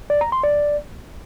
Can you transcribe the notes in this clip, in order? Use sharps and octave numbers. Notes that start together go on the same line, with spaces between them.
D5
A#5
C6
D5